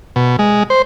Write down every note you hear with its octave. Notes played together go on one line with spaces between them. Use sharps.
B2
G#3
C5